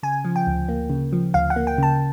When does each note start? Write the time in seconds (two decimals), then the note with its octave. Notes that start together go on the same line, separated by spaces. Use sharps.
0.03 C#3 G#5
0.25 F3
0.36 G5
0.47 D2
0.68 A#3
0.90 C#3
1.13 F3
1.34 D2 F5
1.50 F#5
1.56 A#3
1.67 G5
1.78 C#3 A5